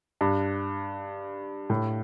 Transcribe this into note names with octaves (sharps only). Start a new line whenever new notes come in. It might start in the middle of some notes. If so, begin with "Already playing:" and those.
G2
A2